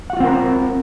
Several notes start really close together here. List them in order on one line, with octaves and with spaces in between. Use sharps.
F#5 F#4 F4 C4 A#4